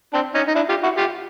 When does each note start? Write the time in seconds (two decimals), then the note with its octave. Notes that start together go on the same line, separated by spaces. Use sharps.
0.13 C4 D4
0.35 C#4 D#4
0.48 D#4
0.55 D4 E4
0.69 F4 G4
0.83 E4 F#4
0.97 F4 G4